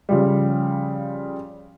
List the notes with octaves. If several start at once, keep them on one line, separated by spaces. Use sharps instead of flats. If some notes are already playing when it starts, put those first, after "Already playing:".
C#3 F3 G3